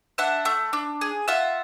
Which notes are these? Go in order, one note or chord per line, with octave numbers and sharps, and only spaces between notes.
D4 E5 F#5
A3
D4
G#4
F4 E5 F#5